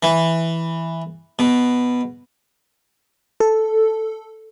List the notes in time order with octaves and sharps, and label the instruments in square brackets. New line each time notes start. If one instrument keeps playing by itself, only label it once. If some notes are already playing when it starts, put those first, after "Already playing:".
[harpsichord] E3
B2
[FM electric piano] A4